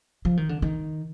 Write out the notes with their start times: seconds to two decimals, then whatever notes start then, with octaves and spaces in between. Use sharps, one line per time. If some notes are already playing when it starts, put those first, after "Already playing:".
0.25 F3
0.37 D#3
0.49 D3
0.62 D#3